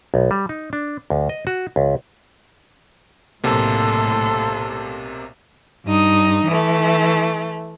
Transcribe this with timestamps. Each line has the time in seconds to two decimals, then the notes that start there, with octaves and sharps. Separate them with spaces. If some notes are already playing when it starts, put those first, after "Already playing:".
0.14 B1
0.31 G3
0.49 D#4
0.73 D4
1.10 D2
1.29 D#5
1.47 F#4
1.76 C#2
3.44 B1 A2 C3 A#3 A4 C6
5.86 G2 D#4 D#6
6.46 E3 A3